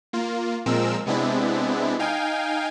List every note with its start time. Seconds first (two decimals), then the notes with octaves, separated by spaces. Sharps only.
0.13 A#3 F4
0.66 A#2 F3 G#3 C4 A#4 E6
1.06 C3 G#3 B3 C4 D4 E4
1.99 D#4 F5 G5 G#5